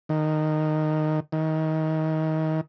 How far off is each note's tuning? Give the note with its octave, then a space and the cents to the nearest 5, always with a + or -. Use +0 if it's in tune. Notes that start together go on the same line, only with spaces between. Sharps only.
D#3 -10
D#3 +25